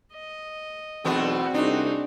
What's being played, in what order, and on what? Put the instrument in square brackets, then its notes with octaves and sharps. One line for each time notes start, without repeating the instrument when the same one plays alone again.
[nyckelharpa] D#5
[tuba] B1 [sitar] E2 A3 B3 [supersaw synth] C4 F#4
[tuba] C2 [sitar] D4 [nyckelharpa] D#4 G#4